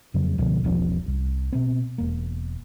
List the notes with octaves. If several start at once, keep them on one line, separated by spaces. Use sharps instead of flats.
F2 C#3 F#3
C#2 B2 D3 F3
E1 B1 F3 C#4
C2
B2 B3 C4
E1 A#3